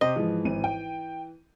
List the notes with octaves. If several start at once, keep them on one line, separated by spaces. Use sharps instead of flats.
C3 G4 C5 D#5
G#2 E3 F3
G#1 D#7
G5